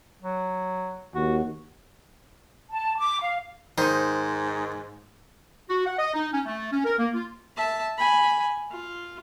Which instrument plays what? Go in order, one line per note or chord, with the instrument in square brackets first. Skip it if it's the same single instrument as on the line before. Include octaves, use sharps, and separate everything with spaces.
[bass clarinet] F#3
[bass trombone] D#2 [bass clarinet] F#4
[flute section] A5
D6
F5
[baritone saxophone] G#2 [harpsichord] D#3 [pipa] D#4 C5
[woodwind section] F#4
F#5
D#5
D#4
C#4
A3
C#4
A#4
A#3
F4
[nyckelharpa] E5 A5
G#5 B5
F4